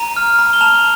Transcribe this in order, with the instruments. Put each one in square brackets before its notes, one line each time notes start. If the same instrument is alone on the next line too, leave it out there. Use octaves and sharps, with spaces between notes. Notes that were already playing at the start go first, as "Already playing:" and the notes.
Already playing: [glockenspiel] A#5 D#7
F6
A#5
G7
A5 F7